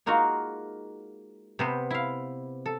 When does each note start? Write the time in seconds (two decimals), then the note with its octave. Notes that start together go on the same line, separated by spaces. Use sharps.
0.06 G#3 A#3 D#4 F4 F#4
1.59 C3 B3 C5
1.91 E4 F5
2.66 A4